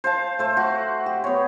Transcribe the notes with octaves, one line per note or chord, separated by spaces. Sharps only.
C5 F5 A5
A3 C5
F#4
G4
B3 C#5